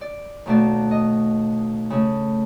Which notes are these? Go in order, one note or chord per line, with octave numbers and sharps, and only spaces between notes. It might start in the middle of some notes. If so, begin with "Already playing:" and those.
D5
D#2 B2 A3 D5
D#5
C#3 A3